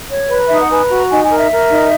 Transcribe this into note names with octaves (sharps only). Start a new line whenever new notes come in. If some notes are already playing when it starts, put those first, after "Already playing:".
C#5
B4 B5
A#5
D#4 E5
F#5
B4 G#5
A#5
F#4
A#5
D#4 G#5
G#5
A#4
E5
A#4
D#4